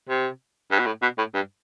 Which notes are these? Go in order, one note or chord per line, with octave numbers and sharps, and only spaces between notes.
C3
G2
B2
A2
B2
A2
G2